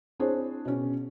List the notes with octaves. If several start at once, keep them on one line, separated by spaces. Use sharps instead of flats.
C4 D4 E4 G#4 C5 C#5
B2 C#4